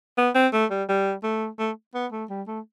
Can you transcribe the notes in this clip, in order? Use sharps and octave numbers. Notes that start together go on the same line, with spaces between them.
B3
C4
A3
G3
G3
A3
A3
B3
A3
G3
A3